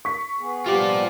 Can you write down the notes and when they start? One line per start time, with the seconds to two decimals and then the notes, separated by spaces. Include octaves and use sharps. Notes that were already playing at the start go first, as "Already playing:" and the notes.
0.05 C#6 B6
0.39 B3 G#4
0.66 F3 G3 B3 F4 G4 D5